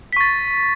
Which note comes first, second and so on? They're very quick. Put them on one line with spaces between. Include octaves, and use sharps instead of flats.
B6 C#6 A6